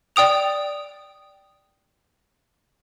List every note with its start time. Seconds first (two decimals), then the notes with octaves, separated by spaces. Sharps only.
0.16 D5 G5 D#6 F7